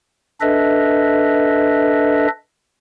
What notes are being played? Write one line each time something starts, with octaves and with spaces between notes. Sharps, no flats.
D4 A4 B4 D#5 E5